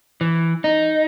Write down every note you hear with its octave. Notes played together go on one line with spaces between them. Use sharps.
E3
D#4